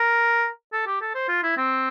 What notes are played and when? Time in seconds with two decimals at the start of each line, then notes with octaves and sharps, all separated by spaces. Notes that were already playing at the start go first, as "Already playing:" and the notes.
Already playing: A#4
0.72 A4
0.86 G4
1.01 A4
1.15 C5
1.29 F4
1.43 E4
1.57 C4